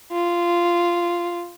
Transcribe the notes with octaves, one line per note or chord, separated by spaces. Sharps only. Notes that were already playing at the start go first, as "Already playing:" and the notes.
F4